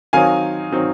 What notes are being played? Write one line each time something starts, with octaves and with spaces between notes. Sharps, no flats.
D#3 F#3 C4 D#4 F5 G#5
D#3 F#3 C4 D#4